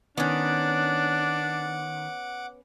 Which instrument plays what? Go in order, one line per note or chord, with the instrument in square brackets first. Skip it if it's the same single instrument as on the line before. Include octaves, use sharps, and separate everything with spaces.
[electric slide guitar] D#3 [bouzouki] B3 C#4 [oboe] D4 [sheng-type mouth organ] F#5 D6